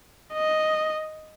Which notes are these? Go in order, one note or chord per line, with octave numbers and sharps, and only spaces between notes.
D#5